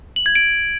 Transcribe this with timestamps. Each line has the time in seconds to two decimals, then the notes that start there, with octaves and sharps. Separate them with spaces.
0.16 F#7
0.26 G#6
0.35 D7